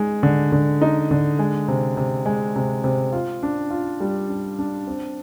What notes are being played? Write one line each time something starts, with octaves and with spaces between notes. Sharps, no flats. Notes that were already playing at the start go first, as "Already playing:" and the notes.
Already playing: G#3 D#4
D3
D3
D#4
D3
G#3
C3
C3
G#3
C3
C3
F4
D4
F4
G3
D4
D4
C4